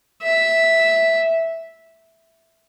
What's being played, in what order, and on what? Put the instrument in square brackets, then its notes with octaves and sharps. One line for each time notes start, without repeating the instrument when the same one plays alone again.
[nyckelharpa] E5